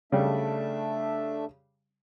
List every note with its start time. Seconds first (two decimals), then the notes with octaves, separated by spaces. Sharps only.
0.12 C#3 G3 A3 D4 E5